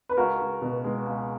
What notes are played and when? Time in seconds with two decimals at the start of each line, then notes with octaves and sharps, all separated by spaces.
0.09 B4
0.17 C#2 F#4 A#4
0.40 C#2
0.62 B2
0.84 G#3
1.07 C#2